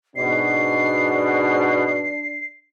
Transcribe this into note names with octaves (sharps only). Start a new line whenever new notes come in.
G#2 B2 D4 C7